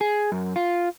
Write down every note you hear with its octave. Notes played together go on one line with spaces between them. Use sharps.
G#4
F#2
F4